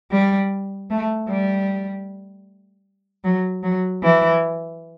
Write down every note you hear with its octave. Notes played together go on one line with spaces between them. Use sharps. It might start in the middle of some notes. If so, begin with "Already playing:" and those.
G3
A3
G3
F#3
F#3
E3